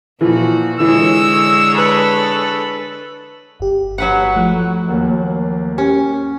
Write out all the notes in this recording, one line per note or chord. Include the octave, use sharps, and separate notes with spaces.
A#2 E3 F3 F#4
D3 E3 G#3 C#5 E6
A4 B4
G1 G4
F#3 B4 F#5
F3 A3 F#6
D#2 A#3
C#4 G4